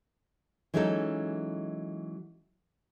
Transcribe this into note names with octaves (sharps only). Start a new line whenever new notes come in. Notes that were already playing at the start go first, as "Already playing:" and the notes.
E3 F#3 G#3 C#4 D#4 A4